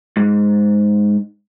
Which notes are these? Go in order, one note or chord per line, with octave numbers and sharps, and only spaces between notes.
G#2